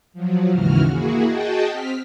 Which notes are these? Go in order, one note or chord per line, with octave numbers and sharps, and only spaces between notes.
F3 F#3
D#2 G#2 C#3 E3 F#4 F6
A#3 E4 F#4 G#4
F#4 G#4 D#5 G5 A5
C4 F6 B6